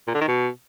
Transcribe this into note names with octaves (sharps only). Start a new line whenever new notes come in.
A#2
D3
D#3
B2